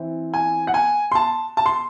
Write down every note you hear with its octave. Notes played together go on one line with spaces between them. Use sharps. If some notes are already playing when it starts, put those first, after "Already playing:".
Already playing: E3 C4
G#5
F#5
G#5
C6
A5
A5
C6